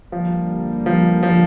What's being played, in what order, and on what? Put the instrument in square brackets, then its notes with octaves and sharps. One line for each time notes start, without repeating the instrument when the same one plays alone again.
[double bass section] D3 G3 A#3 [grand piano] F3
[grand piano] F3
F3